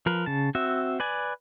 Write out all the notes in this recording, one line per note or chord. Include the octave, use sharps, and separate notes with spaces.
F3 A#4 B4
C#3 A5
C4 F#4 E5
B4 D5 G#5